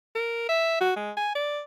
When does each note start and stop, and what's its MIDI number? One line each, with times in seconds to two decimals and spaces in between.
0.15 0.46 70
0.49 0.78 76
0.81 0.92 66
0.96 1.11 56
1.17 1.32 80
1.35 1.60 74